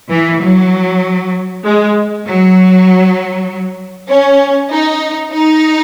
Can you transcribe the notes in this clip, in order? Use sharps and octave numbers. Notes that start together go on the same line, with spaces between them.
E3
F#3
G#3
F#3
C#4
D#4
D#4